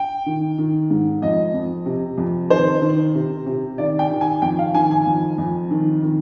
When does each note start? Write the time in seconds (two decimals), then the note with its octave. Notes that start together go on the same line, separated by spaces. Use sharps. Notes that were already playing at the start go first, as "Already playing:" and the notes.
Already playing: G5
0.26 D#3
0.58 D#3
0.90 G#2
1.22 F2 D#5
1.54 F2
1.86 C3
2.18 F2
2.50 D#3 C5
2.82 D#3
3.15 C3
3.46 C3
3.78 D#3 D5
3.99 G5
4.11 D#3
4.21 G#5
4.42 F2 G5
4.59 F5
4.74 D#3 G#5
4.91 G#5
5.07 F2
5.38 F2
5.71 D#3
6.03 D#3